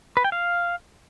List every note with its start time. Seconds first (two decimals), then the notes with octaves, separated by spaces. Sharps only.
0.17 B4
0.24 G5
0.32 F5